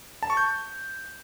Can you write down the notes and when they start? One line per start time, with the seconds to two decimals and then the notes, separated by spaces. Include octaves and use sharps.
0.23 A5
0.30 C#6
0.37 G6